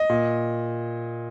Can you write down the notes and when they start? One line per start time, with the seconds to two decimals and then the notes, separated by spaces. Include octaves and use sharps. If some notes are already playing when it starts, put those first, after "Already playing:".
Already playing: D#5
0.09 A#2